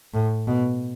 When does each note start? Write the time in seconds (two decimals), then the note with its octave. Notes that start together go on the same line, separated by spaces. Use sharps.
0.14 A2
0.47 B2